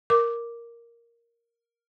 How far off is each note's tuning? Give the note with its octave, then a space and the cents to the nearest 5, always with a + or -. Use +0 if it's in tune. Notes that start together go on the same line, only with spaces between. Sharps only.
A#4 +0 D6 +0